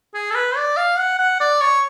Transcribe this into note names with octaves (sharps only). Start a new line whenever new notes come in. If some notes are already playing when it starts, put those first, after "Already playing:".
G#4
A4
B4
D5
F5
F#5
F#5
D5
C#5